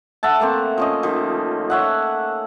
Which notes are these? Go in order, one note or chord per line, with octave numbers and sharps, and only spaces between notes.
A4 E5 F#5 A5
A3 A#3 C4
F3 C#4 D#5
D#3 F3
C#5 E5 F#5